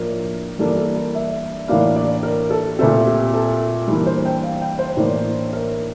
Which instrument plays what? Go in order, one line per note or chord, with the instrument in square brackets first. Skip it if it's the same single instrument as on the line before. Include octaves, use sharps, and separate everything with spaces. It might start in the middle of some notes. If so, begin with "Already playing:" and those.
Already playing: [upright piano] A2 F3 A#3 D4 A#4
G2 E3 A#3 D4 A4
A4
A#4
E5
A2 E3 A#3 D4 F5
D5
A#4
A4
A#2 A3 C4 A4
G4
A4
G2 E3 A#3
C5
G5
F5
G5
C5
A2 E3 A#3 D4
A#4